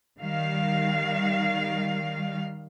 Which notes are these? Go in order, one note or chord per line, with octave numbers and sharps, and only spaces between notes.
D#3 G3 F5